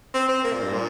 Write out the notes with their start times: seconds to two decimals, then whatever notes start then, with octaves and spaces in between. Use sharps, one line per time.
0.14 C4
0.29 C4
0.44 A#3
0.53 A#2
0.63 G2
0.73 A#2